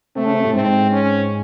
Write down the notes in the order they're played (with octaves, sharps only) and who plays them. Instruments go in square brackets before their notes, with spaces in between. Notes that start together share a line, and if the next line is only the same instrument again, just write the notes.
[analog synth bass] C3 [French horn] A3
[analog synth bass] C#3
C3
A2
[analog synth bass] G#2 [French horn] C4
[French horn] C#4